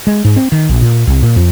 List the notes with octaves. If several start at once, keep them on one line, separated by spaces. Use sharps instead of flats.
G#3
G#2
C4
D#3
A#1
A#2
C2
A#2
F2